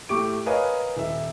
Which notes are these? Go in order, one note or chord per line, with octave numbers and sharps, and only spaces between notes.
A2 A3 G4 C#6 D6 D7
A#4 B4 C#5 D#5 F5 G#5
D#1 E5